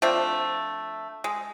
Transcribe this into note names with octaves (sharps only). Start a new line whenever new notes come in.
F3 A3 C4 D4
G#3